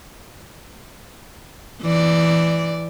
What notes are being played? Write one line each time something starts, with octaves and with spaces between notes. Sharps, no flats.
E3 D5